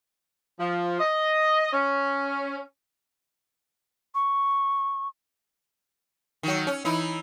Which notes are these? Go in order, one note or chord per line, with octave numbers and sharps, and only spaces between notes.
F3
D#5
C#4
C#6
D#3 F#3
C#4
E3 D#4 E4